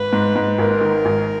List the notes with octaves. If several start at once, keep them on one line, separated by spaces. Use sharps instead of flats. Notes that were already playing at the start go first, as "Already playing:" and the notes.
Already playing: G#1 B4
G#2
G#2
G#1 A#4
D#3
G#1